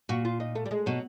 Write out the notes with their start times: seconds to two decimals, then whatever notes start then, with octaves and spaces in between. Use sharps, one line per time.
0.09 A#2 F#4
0.25 F4
0.40 D#4
0.55 A3
0.65 G3
0.71 G#3
0.86 B2 F#3